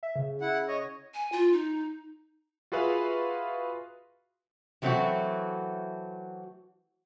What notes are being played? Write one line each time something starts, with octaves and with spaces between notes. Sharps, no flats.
E5
C#3
E4 F#5
C#5 D#5
G#5
F4
D#4
F4 F#4 G#4 B4 E5 F5
E3 F#3 A3 C4 E4 F#4